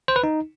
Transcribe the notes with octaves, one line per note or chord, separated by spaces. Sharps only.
C5
B4
D#4